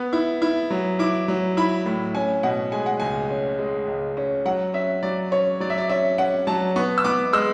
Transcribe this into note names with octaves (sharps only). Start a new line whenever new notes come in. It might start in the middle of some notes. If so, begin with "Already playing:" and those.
Already playing: B3
E4
E4
F#3
E4 D6
F#3
E4 B5
A2
C#4 G#5
B2 F#5
G#3 G#5
F#5
C#2 G#5
C#4
G#3
C#2
C#4
F#3 F#5
C#4 E5
F#3 D5
C#4 C#5
F#3 D5
E5
D5
C#4 E5
C#4 F#5
F#3 A5
B3 C#6
E6
B3 D6
G#3 E6